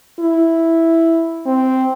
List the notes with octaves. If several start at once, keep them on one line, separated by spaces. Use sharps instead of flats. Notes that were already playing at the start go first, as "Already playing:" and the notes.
E4
C4